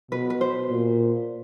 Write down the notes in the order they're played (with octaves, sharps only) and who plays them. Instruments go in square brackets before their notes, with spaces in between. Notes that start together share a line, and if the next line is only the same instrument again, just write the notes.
[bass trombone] B2 [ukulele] B4
[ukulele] B4
C5
[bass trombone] A#2